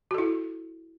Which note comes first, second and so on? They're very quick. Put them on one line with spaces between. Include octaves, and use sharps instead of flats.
F#4 A4 E4